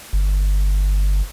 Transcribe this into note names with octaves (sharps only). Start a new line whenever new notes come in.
G1